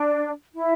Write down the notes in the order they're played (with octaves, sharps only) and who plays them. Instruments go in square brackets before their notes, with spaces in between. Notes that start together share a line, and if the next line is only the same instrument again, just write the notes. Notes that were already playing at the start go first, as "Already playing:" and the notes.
Already playing: [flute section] D4
E4